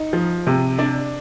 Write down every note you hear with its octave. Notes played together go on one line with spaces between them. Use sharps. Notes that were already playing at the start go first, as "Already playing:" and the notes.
Already playing: D#4
F3
C3
D4 D5